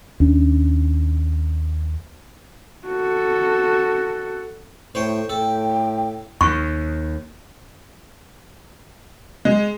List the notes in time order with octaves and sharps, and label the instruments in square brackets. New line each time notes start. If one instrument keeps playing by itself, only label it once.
[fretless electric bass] D#2 C#4 D4
[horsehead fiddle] F#4 A4
[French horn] A2 [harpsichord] C5 C#5 G5
[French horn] A2 [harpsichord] A4 [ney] G5
[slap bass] D#2 [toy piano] C#6
[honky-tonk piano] G#3